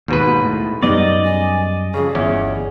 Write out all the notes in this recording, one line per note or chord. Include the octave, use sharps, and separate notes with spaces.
D#2 G#2 B2 B4
A2
F#2 G3 B3 D#4 D5 D#5
G#5
F2 C#3 G#4
G1 E2 C#4